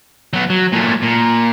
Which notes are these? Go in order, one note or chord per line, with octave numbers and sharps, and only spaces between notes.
F#3 B3
F#3
A#2 A3
A#2